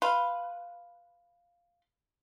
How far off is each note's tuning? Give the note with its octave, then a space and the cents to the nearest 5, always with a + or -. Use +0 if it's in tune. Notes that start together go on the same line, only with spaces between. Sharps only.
B4 +0 F5 +0 C6 +0